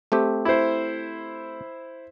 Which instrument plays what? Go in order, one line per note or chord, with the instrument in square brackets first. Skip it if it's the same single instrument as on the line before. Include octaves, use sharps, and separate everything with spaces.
[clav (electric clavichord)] A3 C4 G4
[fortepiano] E4 C5